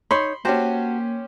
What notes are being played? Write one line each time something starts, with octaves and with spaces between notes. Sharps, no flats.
D#4 C#5 B5 C6
A#3 C#4 F#4 G4 C5 A5